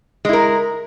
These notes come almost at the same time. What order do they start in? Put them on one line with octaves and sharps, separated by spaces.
G#3 E4 A#4